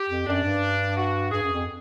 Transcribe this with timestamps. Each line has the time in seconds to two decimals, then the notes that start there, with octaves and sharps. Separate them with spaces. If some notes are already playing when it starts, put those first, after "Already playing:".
Already playing: G4
0.09 F2
0.26 F#2 D4
0.44 G2
0.97 F#4
1.32 G2 G#4
1.43 F#2
1.53 F2